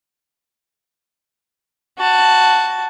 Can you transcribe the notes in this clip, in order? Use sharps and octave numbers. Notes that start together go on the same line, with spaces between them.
F#4 A5